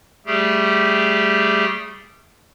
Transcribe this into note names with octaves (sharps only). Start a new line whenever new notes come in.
G3 A3 G4 G#4